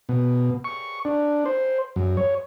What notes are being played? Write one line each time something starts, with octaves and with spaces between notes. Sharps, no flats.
B2
C#6
D4
C5
F#2
C#5